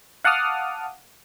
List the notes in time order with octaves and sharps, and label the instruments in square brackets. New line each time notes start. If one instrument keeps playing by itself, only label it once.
[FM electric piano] F5 F#5 A5 D6 D#6 F6